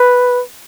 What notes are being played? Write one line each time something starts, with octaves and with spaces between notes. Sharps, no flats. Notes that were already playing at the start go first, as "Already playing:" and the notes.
Already playing: B4